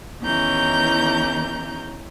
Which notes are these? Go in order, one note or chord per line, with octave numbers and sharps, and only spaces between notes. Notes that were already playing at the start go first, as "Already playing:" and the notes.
E2 D#3 E3 C#4 A#5 G6